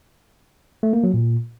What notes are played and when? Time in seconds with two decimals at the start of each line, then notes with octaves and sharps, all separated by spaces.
0.83 A3
0.93 A#3
1.04 F#3
1.14 A#2